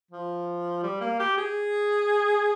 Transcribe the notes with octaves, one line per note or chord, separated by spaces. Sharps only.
F3
G3
A#3
G4
G#4